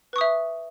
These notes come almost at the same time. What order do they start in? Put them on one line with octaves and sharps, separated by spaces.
B4 C#6 D#6 E5